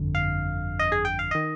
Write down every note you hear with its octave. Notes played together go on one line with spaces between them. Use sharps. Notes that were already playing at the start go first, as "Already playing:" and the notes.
Already playing: G1 F2 D3
F5
D#5
G#4
G5
F5
D#3 D#5